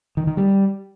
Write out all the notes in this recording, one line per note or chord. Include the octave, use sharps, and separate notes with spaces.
D#3
D#3
G3